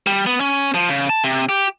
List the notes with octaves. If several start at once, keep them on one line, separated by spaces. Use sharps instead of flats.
G3
B3
C#4
F3
C#3
A5
C3
G4